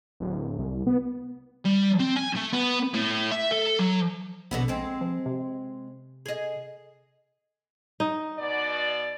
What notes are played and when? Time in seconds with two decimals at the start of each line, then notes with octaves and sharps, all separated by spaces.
0.20 D1
0.58 C2
0.87 B3
1.65 G3
1.99 C4
2.16 G#5
2.36 A3
2.53 B3
2.94 A2
3.31 E5
3.51 A4
3.79 F#3
4.51 A#1 B2 D3 B3
4.68 G#3 C4
5.01 F3
5.26 C3
6.26 G#4 D#5
8.00 D#4
8.38 B2 D5